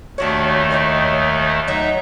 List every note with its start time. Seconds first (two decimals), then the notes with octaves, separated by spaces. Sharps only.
0.18 D#2 D#3 A3 D4 F#4 C#5
0.71 G3 D#4 C#5
1.67 F#3 D#4 C#5 D#5 E5